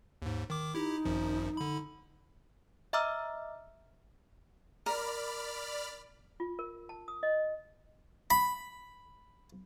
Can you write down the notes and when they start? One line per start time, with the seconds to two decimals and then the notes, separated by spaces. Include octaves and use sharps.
0.22 D#2 G#2
0.50 D#3 D6
0.75 D#4 E4 G4
1.05 G#1 F#2 F3
1.57 D3 B5
2.93 D#5 E5 A#5 D6 E6 F6
4.86 A#4 D5 B5 F6
6.40 F4
6.59 A#4
6.89 A5
7.08 D#6
7.23 D#5
8.31 B5